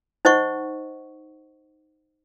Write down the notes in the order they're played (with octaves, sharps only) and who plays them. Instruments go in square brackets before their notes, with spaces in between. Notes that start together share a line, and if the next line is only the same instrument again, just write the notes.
[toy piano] D#4 C5 D#5 F#5 C#6